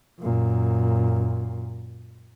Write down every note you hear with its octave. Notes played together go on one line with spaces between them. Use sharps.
F#2 A#2